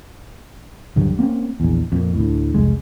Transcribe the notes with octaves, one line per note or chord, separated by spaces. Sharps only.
D1 G2 D3 F#3
A#3 C4 C#4
A#1 E2
F2 A#2
D2 A2
F1 C2 F2 G#3